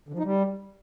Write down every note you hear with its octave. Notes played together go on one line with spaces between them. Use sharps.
D3
F3
D#4
G3